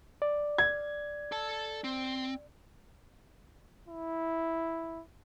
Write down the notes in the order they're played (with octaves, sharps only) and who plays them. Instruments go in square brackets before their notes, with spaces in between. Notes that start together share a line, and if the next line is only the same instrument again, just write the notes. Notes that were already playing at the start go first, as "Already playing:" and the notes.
[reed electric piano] D5
[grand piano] G#6
[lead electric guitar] A4 A5
C4
[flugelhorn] E4